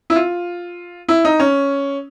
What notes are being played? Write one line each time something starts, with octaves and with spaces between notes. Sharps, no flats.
E4
F4
E4
D#4
C#4